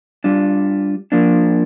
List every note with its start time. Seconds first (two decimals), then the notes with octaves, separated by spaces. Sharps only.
0.24 G3 D4 F4
1.12 F3 A#3 D4